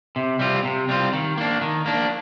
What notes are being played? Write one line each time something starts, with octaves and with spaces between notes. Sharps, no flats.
C3
G3 C4 F4
C3
G3 C4 F4
D#3
A#3 D4
D#3
A#3 D4